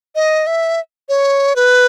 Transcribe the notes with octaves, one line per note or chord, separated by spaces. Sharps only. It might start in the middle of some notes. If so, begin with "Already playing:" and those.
D#5
E5
C#5
B4